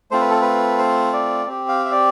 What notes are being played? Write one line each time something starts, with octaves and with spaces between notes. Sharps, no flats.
A3 C4 F4 C5
B4
A4
B4
C5
D5
C4 G4
F5
E5
D5